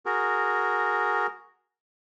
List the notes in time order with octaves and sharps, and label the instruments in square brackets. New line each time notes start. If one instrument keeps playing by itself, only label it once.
[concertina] F#4 G#4 A#4